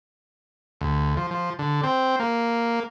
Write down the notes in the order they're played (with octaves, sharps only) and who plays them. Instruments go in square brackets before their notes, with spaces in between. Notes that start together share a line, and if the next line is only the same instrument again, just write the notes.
[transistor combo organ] D2
F3
F3
D3
C4
A#3